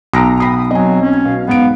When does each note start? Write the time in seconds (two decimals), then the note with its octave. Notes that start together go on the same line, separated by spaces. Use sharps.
0.13 B1 A#5 D#6 A#6 D7
0.40 G5 B5 D#6 C7
0.71 F#3 C4 D#5 G#5
1.02 C#4
1.25 B2 F5
1.48 G#2 B3 D7